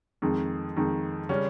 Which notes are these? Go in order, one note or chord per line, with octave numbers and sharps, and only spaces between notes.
F2 D#3 G#3
F2 D#3 G#3
C#3 G3 C#4